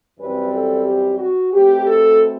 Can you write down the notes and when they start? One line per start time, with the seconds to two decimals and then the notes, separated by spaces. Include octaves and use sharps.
0.19 F#2 E3 G3 C4 B4
0.52 A4
0.85 G4
1.19 F#4
1.53 B2 A3 C4 G4
1.86 A4